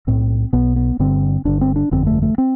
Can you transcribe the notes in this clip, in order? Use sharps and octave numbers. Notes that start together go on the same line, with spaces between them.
B1 A2 C4
B1 B2 B3
B3
G1 G2 D3 C4
G1 G2 D3 D4
C4
D4
G1 F2 D3 C4
A3
A3
C4